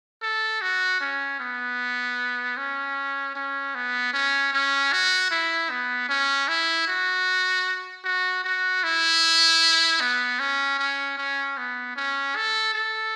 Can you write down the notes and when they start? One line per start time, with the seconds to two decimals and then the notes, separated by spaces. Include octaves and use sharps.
0.22 A4
0.61 F#4
1.01 C#4
1.40 B3
2.57 C#4
3.35 C#4
3.75 B3
4.14 C#4
4.53 C#4
4.93 F#4
5.31 E4
5.70 B3
6.09 C#4
6.48 E4
6.88 F#4
8.05 F#4
8.44 F#4
8.84 E4
10.01 B3
10.40 C#4
10.79 C#4
11.17 C#4
11.58 B3
11.96 C#4
12.36 A4
12.74 A4